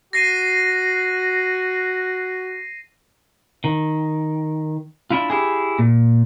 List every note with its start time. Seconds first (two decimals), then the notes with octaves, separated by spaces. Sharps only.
0.13 F#4 A#6 C7 D#7
3.64 D#3
5.11 D4 E4 F4
5.30 E4 G4 G#4
5.79 A#2